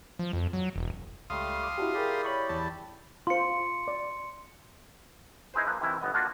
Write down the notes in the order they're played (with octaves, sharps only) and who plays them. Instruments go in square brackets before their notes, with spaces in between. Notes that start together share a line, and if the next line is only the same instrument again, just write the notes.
[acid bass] F3
F2
F#3
E1
[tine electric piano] C#2 [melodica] G3 A3 [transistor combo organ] F5 C6 D#6
[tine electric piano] D6
[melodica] D4 [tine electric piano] E4 F#4 G4
[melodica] E4 G4 D5 [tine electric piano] G#4 A#4
[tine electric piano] C#5 B5 C#6
[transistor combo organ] E2 A5
[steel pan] F4 C5 [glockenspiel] C6 C#7
[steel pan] D5
[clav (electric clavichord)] D#4 E4 G#4 B4 C5
F3 A#3 B4
C3 D#3 E3 E4
G1 B3 D#5
A#3 D4 F4 F#4 A#4